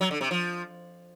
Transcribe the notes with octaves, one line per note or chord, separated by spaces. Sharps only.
F#3
D3
C3
F3